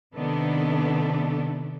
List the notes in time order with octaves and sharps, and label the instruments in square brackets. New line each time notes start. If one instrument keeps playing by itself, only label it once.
[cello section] C3 D#3 B3 D4 A4